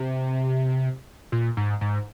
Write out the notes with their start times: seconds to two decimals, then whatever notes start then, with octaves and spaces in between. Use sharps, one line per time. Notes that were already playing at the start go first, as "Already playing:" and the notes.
Already playing: C3
1.32 A#2
1.57 G#2
1.81 G#2